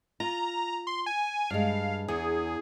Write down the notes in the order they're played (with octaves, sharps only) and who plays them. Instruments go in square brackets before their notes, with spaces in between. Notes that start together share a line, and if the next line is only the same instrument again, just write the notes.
[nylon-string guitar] F4 [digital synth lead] A#5
[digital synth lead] C6
G#5
[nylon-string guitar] G2 G#3 [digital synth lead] F5
[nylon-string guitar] E2 [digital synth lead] G#4